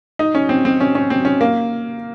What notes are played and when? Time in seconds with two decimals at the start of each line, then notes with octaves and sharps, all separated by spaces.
0.19 D#4
0.35 C#4
0.49 C4
0.65 C4
0.80 C#4
0.95 C#4
1.10 C4
1.25 C#4
1.41 A#3